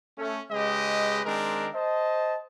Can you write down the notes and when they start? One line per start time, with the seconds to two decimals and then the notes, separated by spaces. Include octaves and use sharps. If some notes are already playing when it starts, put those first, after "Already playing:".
0.18 A3 C#4
0.51 C#3 G#3 G4 B4 D#5
1.25 D#3 G#3 C4 D4 A#4
1.75 C5 D#5 A5